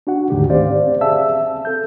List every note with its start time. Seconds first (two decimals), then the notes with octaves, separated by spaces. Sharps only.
0.07 D4 F#4 F#5
0.30 D2 G#2 D3 D#3 A3 G4
0.50 C4 C#4 G4 C5 D5 F5
1.01 G#4 E5 F5 A5 E6
1.33 C4
1.65 A4 G6